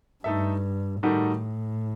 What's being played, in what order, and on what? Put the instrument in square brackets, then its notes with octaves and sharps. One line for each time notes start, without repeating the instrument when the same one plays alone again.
[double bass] G2 [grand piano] A3 D#4 A4 E5
[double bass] A2 [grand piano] D#3 G3 D#4 F#4 A4